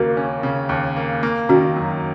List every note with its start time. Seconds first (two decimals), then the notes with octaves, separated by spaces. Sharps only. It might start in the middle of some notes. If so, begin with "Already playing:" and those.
Already playing: D#2 C#3 A#3 F#4 A#4
0.17 C#4
0.43 C#3
0.69 D#2
0.96 A#3
1.23 A#3
1.49 D#3 C#4 F#4
1.76 F#2